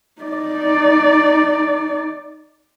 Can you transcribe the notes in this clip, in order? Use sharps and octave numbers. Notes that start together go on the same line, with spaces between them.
D#4 D5